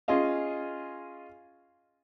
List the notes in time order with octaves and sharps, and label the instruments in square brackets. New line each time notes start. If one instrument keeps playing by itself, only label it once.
[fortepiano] C#4 F4 G#4 D#5 F5